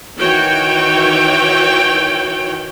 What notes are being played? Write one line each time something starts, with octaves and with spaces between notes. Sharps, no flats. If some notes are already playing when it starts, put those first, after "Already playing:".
D#3 E3 F#4 C#5 G5